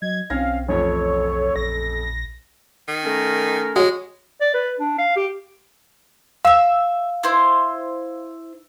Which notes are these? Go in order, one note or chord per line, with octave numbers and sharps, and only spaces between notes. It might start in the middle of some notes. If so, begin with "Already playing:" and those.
F#3 D#5 G#6
B1 C4 C#4 F5 G#6 A#6
A1 F2 A4 C#5
A#1 A#6
D#3
A3 C#4 A#4
G#3 F#4 C#5
D5
B4
D4
F5
G4
E5 F5 E6
E4 C5